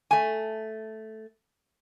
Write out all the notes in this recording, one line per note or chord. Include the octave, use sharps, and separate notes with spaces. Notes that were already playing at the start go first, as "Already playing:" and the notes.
A3 G#5